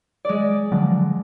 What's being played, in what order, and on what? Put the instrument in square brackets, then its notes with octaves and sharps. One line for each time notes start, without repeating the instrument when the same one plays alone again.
[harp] G#3 D5
[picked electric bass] D3 F3 F#3